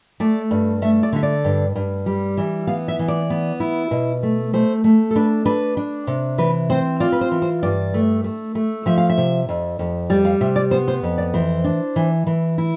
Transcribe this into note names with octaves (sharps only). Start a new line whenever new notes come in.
A3 D5
G2
A3 E5
D5
D3 E5
D5
G2
G2
G3
E3
B3 F5
E5
E3
D5
B3
E4
B2
A3
A3 C5
A3
A4
D4 B4
D4 B4
D4
C3
E3 B4
C4 C5
F4 D5
B4
C5
E3
C5
G2 D5
A3
A3
A3
F3 E5
F5
E5
C3
F2
F2
G3 D5
F5
C3 E5
D5
B3 C5
C5
F2
D5
E3 C5
D4
E3
E3
E4